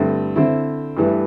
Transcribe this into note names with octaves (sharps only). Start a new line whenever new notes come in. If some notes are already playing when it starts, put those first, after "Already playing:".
Already playing: G2 D3 A3 C4 E4
D3 C4 E4
G2 E3 A3 E4